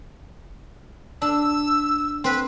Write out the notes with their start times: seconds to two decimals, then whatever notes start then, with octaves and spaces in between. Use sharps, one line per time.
1.22 D4 E6
2.24 C4 B4